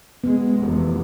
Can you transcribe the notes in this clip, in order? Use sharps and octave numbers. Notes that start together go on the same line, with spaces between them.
G#3 B3
F1 E2